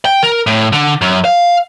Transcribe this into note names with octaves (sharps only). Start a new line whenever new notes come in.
G5
A#4
A2
D3
F#2
F5